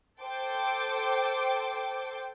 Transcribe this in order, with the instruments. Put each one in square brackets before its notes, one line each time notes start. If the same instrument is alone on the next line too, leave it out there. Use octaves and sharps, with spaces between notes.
[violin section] A4 C5 G5 D6